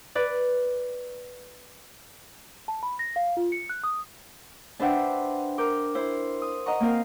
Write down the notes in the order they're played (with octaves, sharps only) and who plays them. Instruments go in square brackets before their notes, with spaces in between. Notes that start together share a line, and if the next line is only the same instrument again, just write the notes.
[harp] B4 D5
[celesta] A5
B5
A#6
F5
F4
C#7
F#6
D#6
[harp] D4 B4 C5 E5 F#5 G5
A#4 D6 G6
E4 C5
D#6
D#5 F#5 A#5 C#6
A#3 C4 A#4 F5